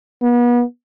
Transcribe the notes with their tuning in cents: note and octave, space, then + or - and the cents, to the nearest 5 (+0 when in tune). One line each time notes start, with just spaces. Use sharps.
B3 -35